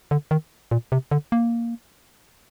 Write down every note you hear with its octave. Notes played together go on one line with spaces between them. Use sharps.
D3
D#3
A#2
C3
D3
A#3